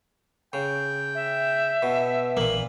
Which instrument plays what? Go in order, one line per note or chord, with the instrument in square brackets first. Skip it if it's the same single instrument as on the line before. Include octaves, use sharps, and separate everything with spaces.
[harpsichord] C#3 [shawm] G5
[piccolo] E5
[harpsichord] B2
[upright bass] A#1 E3 [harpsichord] A#2 A#3 [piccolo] F#7